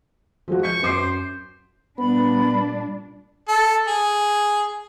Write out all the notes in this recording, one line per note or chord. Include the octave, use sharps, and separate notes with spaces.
F3 G#3 F#4
C#6 G6 B6
F#2 C5 D6 C7
A#2 G3 B3 D4 B5
A4
G#4